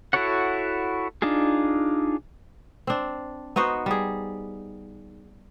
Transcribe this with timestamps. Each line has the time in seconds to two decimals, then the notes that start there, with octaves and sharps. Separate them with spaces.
0.13 E4 F#4 A4 C#5 F#5
1.22 D4 D#4 F4 G#4
2.87 C4 D4
3.56 B3 D#4 F#4 C5
3.86 G3 G#4